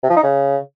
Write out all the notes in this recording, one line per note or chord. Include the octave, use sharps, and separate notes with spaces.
C3
F3
D#4
C#3